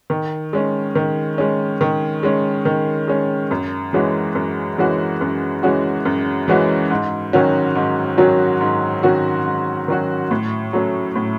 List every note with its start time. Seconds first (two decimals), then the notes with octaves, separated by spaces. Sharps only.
0.10 D#3
0.53 G#3 C#4
0.95 D#3
1.38 G#3 C#4
1.81 D#3
2.23 G#3 C#4
2.65 D#3
3.08 G#3 C#4
3.51 F#2
3.93 E3 G#3 C#4 F#4
4.35 F#2
4.78 E3 G#3 C#4 F#4
5.21 F#2
5.63 E3 G#3 C#4 F#4
6.05 F#2
6.48 E3 G#3 C#4 F#4
6.90 G#2
7.33 D#3 F#3 C#4 F#4
7.75 G#2
8.18 D#3 F#3 C#4 F#4
8.61 G#2
9.03 D#3 F#3 C#4 F#4
9.46 G#2
9.88 D#3 F#3 C#4 F#4
10.31 A2
10.73 F#3 A3 C#4
11.15 A2